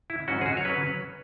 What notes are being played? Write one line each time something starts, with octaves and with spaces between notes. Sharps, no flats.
E4
G#2 F#3 C#4 F#4
G#4
F#4
C#5
F#3 C#4 B4